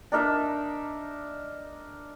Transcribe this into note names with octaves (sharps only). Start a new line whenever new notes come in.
D4 D#4 A#4 E5